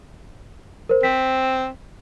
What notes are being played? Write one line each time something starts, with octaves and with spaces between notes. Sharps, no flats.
A#4 C5
C4 B6